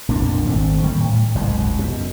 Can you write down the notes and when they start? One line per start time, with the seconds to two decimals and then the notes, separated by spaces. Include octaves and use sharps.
0.08 A#1 F2 A#3 D4
0.46 G#1 D#2 A3 C4
0.82 D#3 G3 A#3
0.99 A2
1.35 F#1 C#2 G#2 C3
1.79 F#2 B2